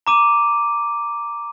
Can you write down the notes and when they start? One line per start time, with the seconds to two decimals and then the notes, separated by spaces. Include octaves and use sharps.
0.07 A#5 D6 D#7